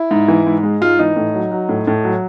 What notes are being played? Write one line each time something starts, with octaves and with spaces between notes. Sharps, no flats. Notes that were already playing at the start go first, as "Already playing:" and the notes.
Already playing: E4
G#2
E3
G#2
G#3
G#2 F4
E3 D#4
A2
F#3
F#3
A2
A2
F#3